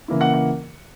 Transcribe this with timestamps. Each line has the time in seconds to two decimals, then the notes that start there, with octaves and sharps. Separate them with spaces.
0.08 C#3 E3 A#3 E4
0.21 F#5
0.34 F#5